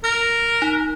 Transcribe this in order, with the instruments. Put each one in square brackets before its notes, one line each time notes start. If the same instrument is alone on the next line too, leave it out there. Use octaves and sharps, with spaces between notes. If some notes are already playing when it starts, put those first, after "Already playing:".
[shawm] A#4 [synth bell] F6 A#6
[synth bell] D#4